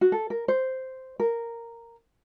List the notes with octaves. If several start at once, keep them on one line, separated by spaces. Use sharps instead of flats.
F#4
A4
A#4
C5
A#4